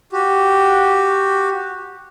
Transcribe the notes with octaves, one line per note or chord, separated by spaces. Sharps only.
F#4 G4